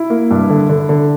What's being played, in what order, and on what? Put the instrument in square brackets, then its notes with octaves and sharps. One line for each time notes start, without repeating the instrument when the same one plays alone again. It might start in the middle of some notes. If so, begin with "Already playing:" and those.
Already playing: [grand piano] E4
A#3
G2
D3
D3
D3